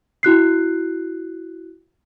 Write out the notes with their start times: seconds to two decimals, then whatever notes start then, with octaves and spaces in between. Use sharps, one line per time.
0.23 E4 F#4 F#6 C7